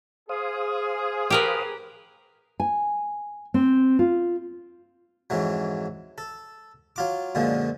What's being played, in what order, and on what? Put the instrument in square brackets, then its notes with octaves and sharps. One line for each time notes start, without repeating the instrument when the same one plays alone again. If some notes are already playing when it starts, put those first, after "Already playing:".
[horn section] G#4 [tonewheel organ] C5 F5 D#6
[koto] G4 A#4 B4
[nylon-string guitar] G#5
C4
F4
[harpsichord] F2 G#2 E3 F#3
A4
F#3 F4 D6
F#2 A#2 D3 F3 G#3